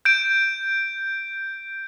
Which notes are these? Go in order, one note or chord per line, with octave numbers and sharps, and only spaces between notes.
G6 D7